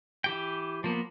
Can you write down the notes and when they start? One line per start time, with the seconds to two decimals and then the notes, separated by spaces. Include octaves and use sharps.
0.24 E3 G4 G5
0.84 F3 A#3 B3